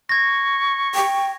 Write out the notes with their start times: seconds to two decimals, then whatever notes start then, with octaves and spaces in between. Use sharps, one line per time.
0.09 C#6 G#6 A#6
0.95 G5